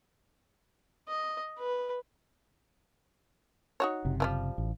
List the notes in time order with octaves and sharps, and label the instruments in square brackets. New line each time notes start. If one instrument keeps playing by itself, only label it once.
[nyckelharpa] D#5
B4
[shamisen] D#4 F#4 C#5
[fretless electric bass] F#1 C3
[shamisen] E3 F3 G3
[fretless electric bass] A1